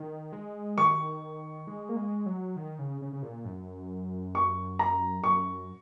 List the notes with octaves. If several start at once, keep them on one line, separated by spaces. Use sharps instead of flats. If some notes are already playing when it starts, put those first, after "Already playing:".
Already playing: D#3
G#3
D#3 C#6
G#3
A#3
G#3
F#3
D#3
C#3
C#3
C#3
A#2
F#2
C#6
A#5
F#2 C#6